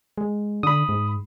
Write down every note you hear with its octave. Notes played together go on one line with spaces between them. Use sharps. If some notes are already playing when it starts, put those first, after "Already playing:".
G#3
D3 B5 D#6
G#2